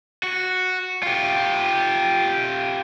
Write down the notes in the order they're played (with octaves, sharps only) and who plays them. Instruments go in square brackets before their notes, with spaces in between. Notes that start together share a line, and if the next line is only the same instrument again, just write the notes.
[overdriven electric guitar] F#4
F4 G4